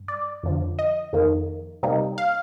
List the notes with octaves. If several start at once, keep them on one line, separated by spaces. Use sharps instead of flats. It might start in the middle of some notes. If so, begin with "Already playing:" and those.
Already playing: G2
D5
F2 D3 F3
D#5
F2 D#3 A#3
C3 G3 A#3 D#4
F5